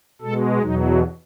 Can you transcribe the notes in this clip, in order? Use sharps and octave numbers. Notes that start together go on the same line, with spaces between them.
B2 G#3 A4
E2 B2 F#3 D#4